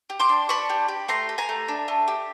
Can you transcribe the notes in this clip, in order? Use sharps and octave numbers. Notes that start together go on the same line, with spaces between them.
G4
C6 D6
D4
D4 B5 C#6
G4
G4
A3 A#5 C6
G4
G#5 A#5
A3
D4
A3
G4